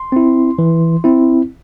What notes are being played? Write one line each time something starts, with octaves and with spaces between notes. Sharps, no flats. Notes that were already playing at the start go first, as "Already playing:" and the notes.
Already playing: C6
C4 E4
E3
C4 E4